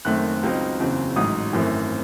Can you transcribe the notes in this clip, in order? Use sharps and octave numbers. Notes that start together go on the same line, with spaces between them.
F#1 F#2 D#3 A3 C4 F#6
C#2 C#3 F#3 C4 D#4
F#1 E2 C#3 F#3 C4
A1 G#2 F#3 A3 D#6
G#1 F#2 E3 A3 C4